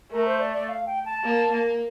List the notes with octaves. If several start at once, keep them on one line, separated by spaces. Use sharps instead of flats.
A3 A#4
C5
D5
D5
F5
G5
A5
A#3
A#3